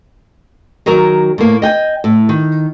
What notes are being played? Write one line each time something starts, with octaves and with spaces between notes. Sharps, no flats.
D#3 F#3 G#4 A#4
A2 A#3
D#5 G5 G#5
A2
D#3